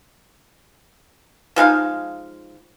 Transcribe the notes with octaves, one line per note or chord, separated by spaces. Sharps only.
F3 G#3 D#4 F5